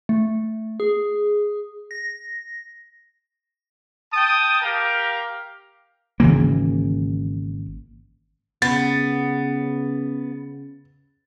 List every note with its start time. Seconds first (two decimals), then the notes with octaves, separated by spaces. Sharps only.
0.09 A3
0.80 G#4
1.91 A#6
4.13 G5 A5 D#6
4.62 G4 A#4 F5 G5
6.20 G#1 C#3 E3 A#3
8.62 C#3 B3 A6